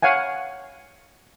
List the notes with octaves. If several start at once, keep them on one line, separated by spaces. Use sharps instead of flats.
C#5 F5 F#5 G#5